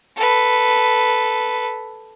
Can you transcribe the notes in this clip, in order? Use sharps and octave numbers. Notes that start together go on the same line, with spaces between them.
A4 B4